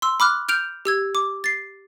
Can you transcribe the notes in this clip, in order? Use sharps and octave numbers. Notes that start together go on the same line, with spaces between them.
C6 E6
B5 D6 F6 F#6
F6 G6 D7 F7
G4 E6 G#6
D6
A6 C7